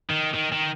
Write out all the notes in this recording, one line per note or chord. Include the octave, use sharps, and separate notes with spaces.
D#3
D#3
D#3